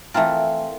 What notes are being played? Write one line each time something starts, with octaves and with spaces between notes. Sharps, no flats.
E3 A3 C4 F4 A#4